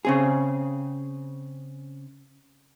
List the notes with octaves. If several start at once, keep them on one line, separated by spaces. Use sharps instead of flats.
C#3 C4 G#4